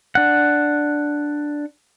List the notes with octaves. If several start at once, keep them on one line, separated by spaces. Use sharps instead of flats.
D4 F#5